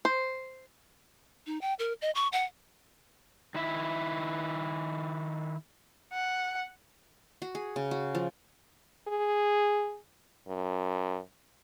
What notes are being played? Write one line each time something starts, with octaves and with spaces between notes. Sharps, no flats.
C5
D#4
G5
A#4
D#5
C#6
F#5
D#3 E4 E5
F#5
F#4
G#4
C#3
F#4
F3
G#4
F#2